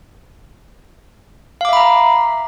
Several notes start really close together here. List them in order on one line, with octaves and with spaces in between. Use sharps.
F5 D6 E5 B5 A#5